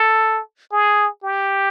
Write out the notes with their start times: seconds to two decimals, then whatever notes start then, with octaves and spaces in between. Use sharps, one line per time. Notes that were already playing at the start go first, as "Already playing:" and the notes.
Already playing: A4
0.72 G#4
1.24 G4